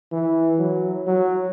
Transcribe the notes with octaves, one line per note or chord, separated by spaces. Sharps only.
E3
F#3
F#3